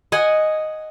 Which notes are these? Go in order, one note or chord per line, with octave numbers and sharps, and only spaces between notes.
D#5 F#5 G#5